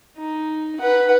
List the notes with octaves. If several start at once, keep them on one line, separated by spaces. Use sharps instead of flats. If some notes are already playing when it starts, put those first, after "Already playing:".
D#4
B4 F#5